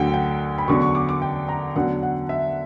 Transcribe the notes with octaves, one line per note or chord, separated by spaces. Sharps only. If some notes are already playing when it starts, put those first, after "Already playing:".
Already playing: D2 D3 F#3 F#5 G5
G5
B5
E2 D3 F#3 C#6
C#6
D6
D6
G5
A#5
E2 D3 F#3 F#5
F#5
E5